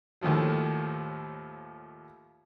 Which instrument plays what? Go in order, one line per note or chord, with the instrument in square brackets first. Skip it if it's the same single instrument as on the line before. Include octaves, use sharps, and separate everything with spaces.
[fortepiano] D#2 A2 D#3 F3 F#3